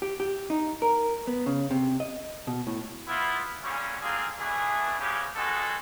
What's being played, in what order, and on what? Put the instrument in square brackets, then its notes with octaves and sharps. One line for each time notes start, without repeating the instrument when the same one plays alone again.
[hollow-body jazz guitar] G4
G4
D#4
A#4
B3
C#3
C3
D#5
B2
A2
[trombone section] B3 E4 F4
F#2 A#2 D3 G3 C#4
D3 A#3 C4 F4 G#4
B2 E3 A3 B3 D4 G#4
G#2 C#3 G#3 B3 C#4 G4
B2 G#3 C4 F#4 G#4 A4